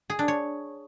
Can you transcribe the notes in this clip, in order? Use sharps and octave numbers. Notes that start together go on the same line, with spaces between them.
G#4
D4
C#5